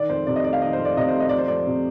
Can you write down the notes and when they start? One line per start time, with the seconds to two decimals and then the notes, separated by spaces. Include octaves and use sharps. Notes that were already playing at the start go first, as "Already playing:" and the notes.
Already playing: D#3 D5
0.09 F2 C5
0.27 C3 D5
0.36 D#5
0.44 A3 D5
0.53 F5
0.62 D#3 D#5
0.73 C5
0.79 F2
0.85 D5
0.97 C3 D#5
1.09 C5
1.14 A3
1.20 D#5
1.29 F3 D5
1.38 C5
1.48 F2 D5
1.67 C3